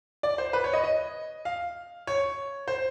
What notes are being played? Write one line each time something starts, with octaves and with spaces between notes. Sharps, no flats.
D5
C5
B4
C#5
D#5
D#5
F5
C#5
C5